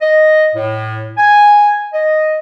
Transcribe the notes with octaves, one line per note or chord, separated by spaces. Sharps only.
D#5
A2
G#5
D#5